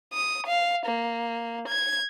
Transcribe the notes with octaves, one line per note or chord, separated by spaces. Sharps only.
D#6
F5
A#3
G#6